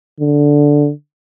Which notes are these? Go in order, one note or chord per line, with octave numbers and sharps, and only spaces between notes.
D3